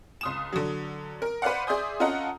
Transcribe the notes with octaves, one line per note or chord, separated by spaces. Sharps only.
C#2 D#6 E7
D3 F#3
A#4
B4 C5 D5 F5 F#5
G#4 D5 E5 C6 D#6 G6
C#4 F4 A4 D#5 F#5 A#5